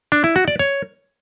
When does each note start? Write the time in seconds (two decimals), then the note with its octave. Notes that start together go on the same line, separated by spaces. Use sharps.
0.12 D4
0.24 E4
0.36 F#4
0.48 D5
0.59 C#5